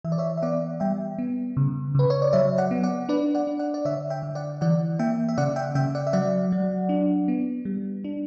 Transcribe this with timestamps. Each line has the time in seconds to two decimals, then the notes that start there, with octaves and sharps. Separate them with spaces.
0.04 E3 E5
0.12 D5
0.18 C#5 E5
0.37 E5
0.42 B3 D5 F#5
0.80 G3 E5 G5
1.19 B3
1.57 C#3
1.95 C#3 B4
2.10 C#5
2.22 D5
2.33 F#3 C#5 E5
2.58 D5 F#5
2.71 B3
2.83 D5 F#5
3.09 D4 B4 D5
3.35 D5 F#5
3.47 D4
3.59 D5 F#5
3.74 D5
3.85 D3 C#5 E5
4.10 E5 G5
4.23 D3
4.35 D5 F#5
4.61 E3 D5 F#5
4.99 A#3 E5 G5
5.29 E5
5.38 C#3 D5 F#5
5.56 E5 G5
5.75 C#3 E5 G5
5.95 D5 F#5
6.07 E5
6.13 F#3 D5 F#5
6.52 F#3
6.89 D4
7.28 B3
7.65 G3
8.04 D4